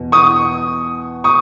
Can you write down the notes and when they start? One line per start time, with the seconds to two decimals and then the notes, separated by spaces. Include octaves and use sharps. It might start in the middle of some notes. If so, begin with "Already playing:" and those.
Already playing: E2 B2
0.12 C#6 D#6
1.24 C#6 D#6